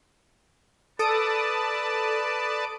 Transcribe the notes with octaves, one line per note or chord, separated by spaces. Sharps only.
A4 B4 D5 A5 D#6 D7